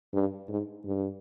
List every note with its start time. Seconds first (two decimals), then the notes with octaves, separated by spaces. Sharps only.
0.14 G2
0.49 G#2
0.85 G2